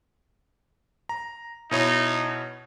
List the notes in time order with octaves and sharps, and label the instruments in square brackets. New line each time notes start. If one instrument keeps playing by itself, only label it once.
[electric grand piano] A#5
[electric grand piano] B2 E4 C#5 [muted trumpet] D#4